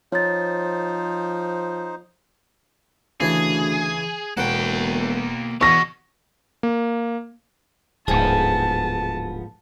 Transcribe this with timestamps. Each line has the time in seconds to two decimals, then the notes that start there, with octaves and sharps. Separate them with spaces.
0.12 F3 D#4 C5 C#5 A6
3.20 D2 C#3 E3 G#4 A5
4.37 E1 B1 A#3 F#5 G5
5.61 E2 B2 B3 C#6 A#6
6.63 A#3
8.08 D1 G#2 F3 B3 G#4 A5